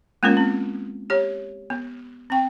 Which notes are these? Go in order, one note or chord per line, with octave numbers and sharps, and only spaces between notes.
G#3 A#3 B3 C#4 F4 A#4
C4
G4 C#5
B3
C4 G5